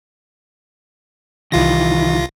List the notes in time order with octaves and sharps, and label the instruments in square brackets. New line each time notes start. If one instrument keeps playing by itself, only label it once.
[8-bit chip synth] C2 F4 A#6 [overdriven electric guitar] D#3 E3